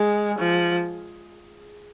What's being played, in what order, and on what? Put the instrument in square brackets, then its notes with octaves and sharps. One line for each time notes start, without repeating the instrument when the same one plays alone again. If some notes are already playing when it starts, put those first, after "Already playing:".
Already playing: [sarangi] G#3 [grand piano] G#4
[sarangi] F3